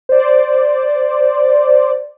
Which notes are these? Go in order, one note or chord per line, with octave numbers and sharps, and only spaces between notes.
C5 D5